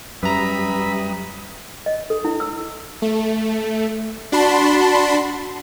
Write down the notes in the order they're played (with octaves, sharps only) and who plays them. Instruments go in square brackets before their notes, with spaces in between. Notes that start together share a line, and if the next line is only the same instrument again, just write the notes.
[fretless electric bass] F#2 [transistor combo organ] G3 D#6 [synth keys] B4 A#5 [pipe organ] E5 B5
[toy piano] D#5
A4
E4
E6
[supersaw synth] A3
D4 F#4 A5 B5 C6